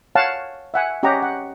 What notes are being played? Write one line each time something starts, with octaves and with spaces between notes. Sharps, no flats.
C#5 F5 F#5 A5
E5 F#5 G#5
C#4 G4 D#5 F#5 A#5
F#5